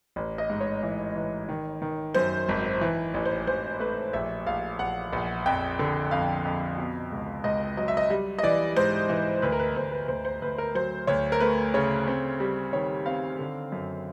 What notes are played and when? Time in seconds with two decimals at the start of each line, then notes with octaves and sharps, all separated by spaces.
0.16 A1
0.38 D#5
0.50 G#2
0.61 C#5
0.83 E3
1.16 E3
1.49 D#3
1.82 D#3
2.14 F#2 C5
2.49 G#1
2.81 E3
3.14 A1
3.25 C5
3.47 A1 C5
3.80 A3 B4
4.13 A#1 E5
4.46 A#1 F5
4.79 A#1 F#5
5.13 A#1
5.46 F2 G5
5.79 D3
6.11 F2 F5
6.45 F2
6.78 B2
7.12 C#2
7.44 C#2 D#5
7.77 F#3 D#5
7.88 E5
7.97 D#5
8.10 G3
8.39 D#5
8.43 E3 D5
8.76 G#2 C5
9.09 E3
9.42 D2 B4
9.52 A#4
9.60 B4
9.76 D2 C5
9.92 B4
10.08 D2 C5
10.25 C5
10.42 D2 B4
10.58 A#4
10.75 F#3 C5
11.07 D2 C#5
11.32 A#4
11.40 A3 B4
11.74 C#3 C#5
12.08 C4
12.40 G3
12.73 D#3 C#5
13.06 C4 F5
13.39 D3
13.72 F#2